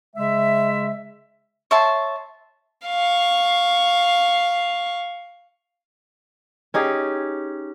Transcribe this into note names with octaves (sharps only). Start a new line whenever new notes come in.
C#3 G#3 E5
C#5 E5 A5 C6
F5 C#6
C#4 D#4 G4 G#4